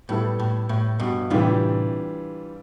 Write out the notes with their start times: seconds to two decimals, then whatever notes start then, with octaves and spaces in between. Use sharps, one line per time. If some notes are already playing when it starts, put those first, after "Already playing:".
0.09 A2 G3 B3 E4 A4
0.39 A2
0.69 A2
1.00 G2 B2
1.30 A2 C3 E3 G3 D4 F4